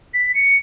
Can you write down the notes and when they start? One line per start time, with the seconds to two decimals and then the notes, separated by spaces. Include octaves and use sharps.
0.14 B6
0.35 C#7